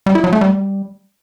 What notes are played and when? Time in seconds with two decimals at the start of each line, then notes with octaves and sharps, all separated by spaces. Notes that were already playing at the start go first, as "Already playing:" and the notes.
0.06 G3
0.15 E4
0.24 F#3
0.33 A3
0.41 G3